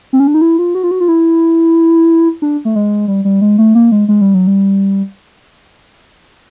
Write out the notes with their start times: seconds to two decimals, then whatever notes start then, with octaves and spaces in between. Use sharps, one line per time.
0.13 C4
0.20 C#4
0.27 D4
0.34 D#4
0.41 E4
0.59 F4
0.75 F#4
0.83 F4
0.91 F#4
1.00 F4
1.08 E4
2.42 D4
2.65 A3
2.75 G#3
3.08 G3
3.25 G3
3.41 G#3
3.58 A3
3.75 A#3
3.92 G#3
4.08 G#3
4.21 G3
4.34 F#3
4.47 G3